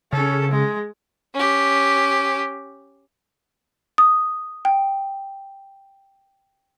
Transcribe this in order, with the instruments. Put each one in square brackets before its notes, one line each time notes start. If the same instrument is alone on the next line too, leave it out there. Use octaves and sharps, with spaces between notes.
[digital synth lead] C#3 [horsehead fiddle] C#4 A4
[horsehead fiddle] G#3
[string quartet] C#4 G4
[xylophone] D#6
G5